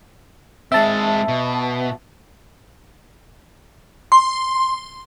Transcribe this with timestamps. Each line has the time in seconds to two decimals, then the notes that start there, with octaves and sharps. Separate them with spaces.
0.72 G#3 C4 E5 A5
1.28 B2
4.12 C6